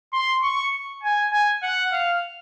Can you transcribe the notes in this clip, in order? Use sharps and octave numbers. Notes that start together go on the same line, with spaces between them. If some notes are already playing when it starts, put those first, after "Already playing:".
C6
C#6
G#5
G#5
F#5
F5